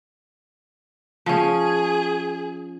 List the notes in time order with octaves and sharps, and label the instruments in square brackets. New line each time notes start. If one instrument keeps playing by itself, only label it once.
[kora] F3 C#4 [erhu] G#4